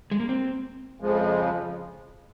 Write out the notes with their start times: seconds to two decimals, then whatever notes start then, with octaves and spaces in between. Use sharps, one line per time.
0.11 G#3
0.20 A#3
0.29 C4
1.00 F2 C#3 F3 G#3